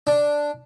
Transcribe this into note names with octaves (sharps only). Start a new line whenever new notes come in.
D4